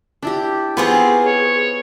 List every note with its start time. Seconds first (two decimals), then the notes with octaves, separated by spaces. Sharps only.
0.23 D4 E4 G4
0.77 B3 C4 F4 G#4 C5 C#6
1.25 C#5